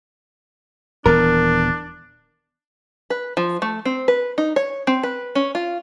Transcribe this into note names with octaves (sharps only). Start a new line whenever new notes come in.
D#1 E3 B3 D4 A#4
B4
F3
A3
C4
B4
D#4
C#5
C4
B4
C#4
F4